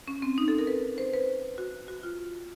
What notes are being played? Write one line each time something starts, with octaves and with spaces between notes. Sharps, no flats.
C#4
C4
D#4
A4
A#4
B4
C5
B4
F#4
F#4
F4